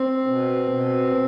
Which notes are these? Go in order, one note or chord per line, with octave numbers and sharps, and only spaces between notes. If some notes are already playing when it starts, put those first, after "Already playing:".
Already playing: C4
B2
B2